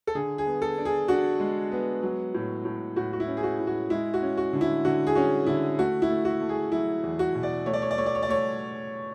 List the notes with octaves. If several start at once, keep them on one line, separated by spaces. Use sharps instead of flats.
A4
D3 G#4
G#4
B3
A4
D4
G#4
D4 F#4
G#3
B3
F#3
A2
A2
A2 F#4
F#4
E4
C#4
G#4
F#4
A2
F#4
G#3 E4
F#4
C#4
F#4
D3
E4
D3 F#4
G#4
C#4 F#4
D3 E4
A3 F#4
E4
A3
F#4
A3
G#4
F#3 E4
E2
F#4
B2
D5
A3 C#5
D5
C#5
D5
A3 C#5
D5
C#5
D5
A3 C#5